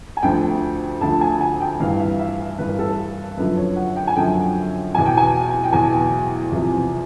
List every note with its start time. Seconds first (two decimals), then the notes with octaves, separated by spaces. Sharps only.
0.17 G#5
0.23 D2 D3 F3 G5
1.01 D2 D3 F3 A5
1.21 G#5
1.41 G#5
1.60 G5
1.80 G2 E3 F5
1.99 E5
2.19 E5
2.39 B4
2.58 G2 E3 B4
2.69 A#4
2.79 A4
2.89 A#4
3.37 F#2 D3 F3 B4
3.57 C#5
3.76 F#5
3.96 G5
4.07 G#5
4.16 F#2 D3 F3 G5
4.94 E2 B2 G#5
5.06 G5
5.17 G#5
5.64 G5
5.73 E2 B2 G#5
6.52 E2 C3 F3